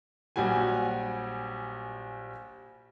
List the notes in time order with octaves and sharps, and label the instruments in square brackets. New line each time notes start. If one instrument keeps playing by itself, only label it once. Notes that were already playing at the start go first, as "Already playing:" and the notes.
[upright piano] A#1 F#3 G3 F#4 G#5